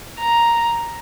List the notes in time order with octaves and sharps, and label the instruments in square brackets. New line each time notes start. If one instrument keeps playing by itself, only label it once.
[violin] A#5